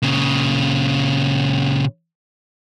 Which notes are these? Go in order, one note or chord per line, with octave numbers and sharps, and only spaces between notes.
A#2 C#3